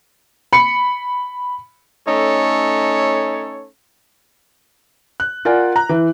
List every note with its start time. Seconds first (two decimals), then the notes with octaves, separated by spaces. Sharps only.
0.53 B5 C#7
2.07 A3 C#4 D#4 A4 C#5
5.20 F#6
5.45 F4 A#4 D5 F#5 G#5
5.76 A#5 F#6
5.89 E3